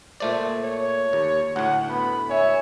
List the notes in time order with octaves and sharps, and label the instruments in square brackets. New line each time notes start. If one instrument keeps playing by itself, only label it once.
[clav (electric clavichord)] A#2 A3 D5 [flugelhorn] C5
[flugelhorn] C#5
[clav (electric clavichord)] D#2
[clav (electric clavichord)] D2 A2 [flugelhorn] F#5
[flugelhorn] B3 [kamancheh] B5
[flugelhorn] C#5 [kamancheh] E5 G#5